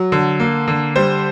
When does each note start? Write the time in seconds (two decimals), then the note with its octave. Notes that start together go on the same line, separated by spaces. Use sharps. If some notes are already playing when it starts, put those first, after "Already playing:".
Already playing: F#3
0.12 D3
0.40 A#3
0.68 D3
0.96 G3 C5